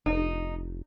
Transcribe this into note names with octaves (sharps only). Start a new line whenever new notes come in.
F1 D#4